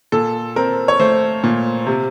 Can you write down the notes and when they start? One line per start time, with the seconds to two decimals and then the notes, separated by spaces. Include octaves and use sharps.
0.12 A#2 A4
0.56 C4 A#4
0.88 C#5
1.00 A3 C5
1.44 A#2
1.86 C3